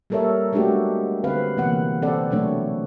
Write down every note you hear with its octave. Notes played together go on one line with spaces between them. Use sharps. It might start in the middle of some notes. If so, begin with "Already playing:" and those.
G3 A#3 A4 A#4 C#5 E5
G#3 A3 B3 D4 F#4 G4
D3 C4 B4 F5
C3 E3 A#3 B3 F#5
C4 A4 D5 F#5
B2 F#3 A3 D4 C#5